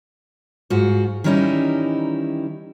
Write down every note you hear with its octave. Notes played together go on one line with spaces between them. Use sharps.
G#2 F4 F#4
D#3 E3 G3 C#4 D#4 E4